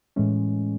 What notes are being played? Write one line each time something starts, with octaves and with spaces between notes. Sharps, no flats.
A2 E3 G#3 C#4